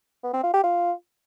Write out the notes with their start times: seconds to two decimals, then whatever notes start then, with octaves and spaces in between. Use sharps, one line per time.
0.23 B3
0.33 C4
0.43 F4
0.53 G4
0.64 F4